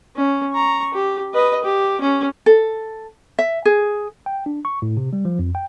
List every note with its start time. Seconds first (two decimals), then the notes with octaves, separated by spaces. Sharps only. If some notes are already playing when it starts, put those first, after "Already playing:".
0.16 C#4
0.53 A#5 C#6
0.94 G4
1.34 B4 D#5
1.64 G4
2.01 C#4
2.46 A4
3.39 E5
3.65 G#4
4.26 G5
4.46 D4
4.65 C#6
4.82 A2
4.97 C3
5.13 G3
5.25 F3
5.39 F2
5.55 G5